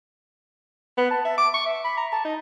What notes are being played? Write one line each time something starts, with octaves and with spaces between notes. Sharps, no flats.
B3
A5
E5
D6
C#6
E5
B5
A#5
A5
D#4